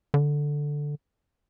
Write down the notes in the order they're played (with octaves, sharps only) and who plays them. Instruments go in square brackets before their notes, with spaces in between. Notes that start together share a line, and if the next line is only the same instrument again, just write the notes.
[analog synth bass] D3